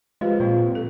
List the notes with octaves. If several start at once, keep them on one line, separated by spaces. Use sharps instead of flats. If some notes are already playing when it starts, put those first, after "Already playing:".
F3 G#3 G4 B4 F5
A#2 A#3 C4 F4
A4